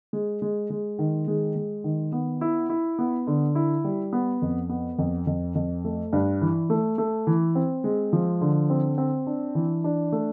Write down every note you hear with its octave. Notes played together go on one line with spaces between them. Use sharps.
G#3
G#3
G#3
D#3
G#3
G#3
D#3
B3
E4
E4
B3
D3
E4
G3
B3
F2
B3
F2
F2
F2
A3
G2
E3
A3
A3
E3
C4
G#3
F3
D3
C4
C4
D4
E3
D4
A3